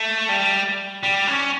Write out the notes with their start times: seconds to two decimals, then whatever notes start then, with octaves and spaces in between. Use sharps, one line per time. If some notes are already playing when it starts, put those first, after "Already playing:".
Already playing: A3
0.29 G3
1.03 G3
1.27 C#4